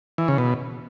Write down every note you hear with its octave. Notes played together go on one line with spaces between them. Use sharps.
E3
C#3
B2